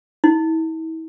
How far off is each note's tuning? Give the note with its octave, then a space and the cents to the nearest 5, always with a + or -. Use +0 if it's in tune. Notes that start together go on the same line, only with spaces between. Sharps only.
E4 -40